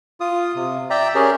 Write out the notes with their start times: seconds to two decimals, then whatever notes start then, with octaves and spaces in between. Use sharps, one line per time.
0.20 F4 D#6
0.56 C3
0.90 D5 E5 G5 A#5
1.15 C#4 G4 G#4 A#4